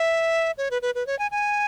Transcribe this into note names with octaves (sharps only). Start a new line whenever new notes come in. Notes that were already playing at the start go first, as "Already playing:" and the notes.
Already playing: E5
C#5
B4
B4
B4
C#5
G#5
G#5